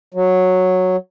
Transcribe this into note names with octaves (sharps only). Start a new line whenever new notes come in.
F#3